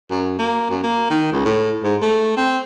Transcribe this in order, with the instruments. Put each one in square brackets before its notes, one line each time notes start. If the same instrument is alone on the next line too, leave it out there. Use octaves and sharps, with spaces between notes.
[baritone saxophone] F#2
A#3
F#2
A#3
D#3
C#2
A2
G#2
A3
C4